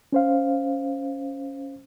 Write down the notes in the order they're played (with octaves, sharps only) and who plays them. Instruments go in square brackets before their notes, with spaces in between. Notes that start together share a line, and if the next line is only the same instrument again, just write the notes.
[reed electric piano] C#4 C5 F5